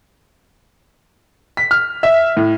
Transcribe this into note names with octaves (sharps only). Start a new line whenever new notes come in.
B6
F6
E5
A2